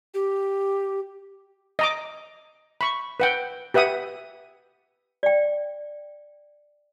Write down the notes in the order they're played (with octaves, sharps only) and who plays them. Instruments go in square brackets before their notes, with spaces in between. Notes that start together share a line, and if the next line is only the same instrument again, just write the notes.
[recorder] G4
[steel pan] D#5 A#5 D6
B5 C#6
B4 F#5 G5
G4 B4 E5 F#5 D#6
[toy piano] D5 G5